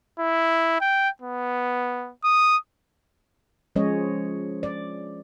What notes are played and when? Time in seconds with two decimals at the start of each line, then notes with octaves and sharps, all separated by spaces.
0.19 E4
0.81 G5
1.22 B3
2.24 D#6
3.76 F3 G#3 C#4 C#5 D#5
4.63 D5